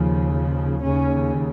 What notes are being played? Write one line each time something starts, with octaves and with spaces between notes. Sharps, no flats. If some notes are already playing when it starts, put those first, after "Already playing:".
Already playing: D#2 C#3 F3
F3
D#2 C#3 C#4